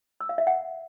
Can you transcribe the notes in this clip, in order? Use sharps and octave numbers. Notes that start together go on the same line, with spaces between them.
E6
F5
E5
F#5